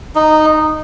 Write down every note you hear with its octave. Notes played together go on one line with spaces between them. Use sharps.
D#4